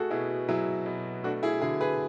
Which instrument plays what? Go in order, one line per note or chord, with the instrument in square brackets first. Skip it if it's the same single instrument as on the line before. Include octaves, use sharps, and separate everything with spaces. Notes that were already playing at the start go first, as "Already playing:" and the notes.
Already playing: [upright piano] A3 F#4 G#4 A4
B2 E4 G#4
F#3 E4 G#4
B2
A3 D4 F#4
E4 G#4
D3 E4 G#4
G#4 B4